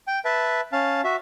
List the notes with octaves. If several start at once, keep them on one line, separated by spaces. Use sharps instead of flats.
G5
B4 E5 A5
C#4 F5 A5
F#4 E5